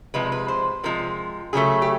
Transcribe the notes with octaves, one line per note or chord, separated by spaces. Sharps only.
C3 F3 G#3 B4
B4
C5
C3 F3 G#3 A#4
C#3 F#3 A3 G#4
G4